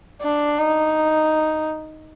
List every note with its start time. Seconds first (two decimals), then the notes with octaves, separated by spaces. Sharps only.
0.22 D4
0.59 D#4